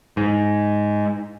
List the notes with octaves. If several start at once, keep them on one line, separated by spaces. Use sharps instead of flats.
G#2